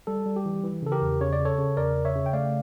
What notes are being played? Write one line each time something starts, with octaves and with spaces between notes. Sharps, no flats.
G3 A4
G3
G4
E3
E3
C#3 A4
G4 A#4
E2
C#3 C#5
D5
C#3
A4 C#5
C#3
E2 A#4 D5
C#3
C#5 E5
C#3
G5
A3 D5 F5